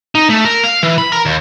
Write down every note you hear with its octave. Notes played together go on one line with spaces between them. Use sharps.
D#4
A3
A#4
F5
E3
B5
A#4
D#2